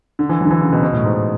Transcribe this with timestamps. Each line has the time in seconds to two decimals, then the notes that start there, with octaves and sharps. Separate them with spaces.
0.19 D3
0.29 E3
0.41 D3 F#3
0.51 E3
0.61 C#3
0.73 B2
0.83 B2
0.93 A2
1.04 G#2